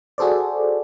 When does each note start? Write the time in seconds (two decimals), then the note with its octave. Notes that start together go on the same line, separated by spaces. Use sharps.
0.18 F#4 G#4 A4 C5 D5